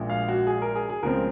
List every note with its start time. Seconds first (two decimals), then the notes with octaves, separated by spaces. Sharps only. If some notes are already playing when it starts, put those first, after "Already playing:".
Already playing: A#1 A#2 G#3
0.10 F5
0.28 F#4
0.47 G#4
0.62 A#4
0.76 G#4
0.89 G#4
1.03 C#2 C#3 F3 G#3 C4 A#4